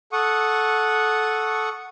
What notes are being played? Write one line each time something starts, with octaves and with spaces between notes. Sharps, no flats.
A4 F#5 C#6 D#6